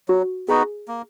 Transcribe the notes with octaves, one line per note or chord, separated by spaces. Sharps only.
F#3 F#4
B3 D#4 F#4 G#4
A#3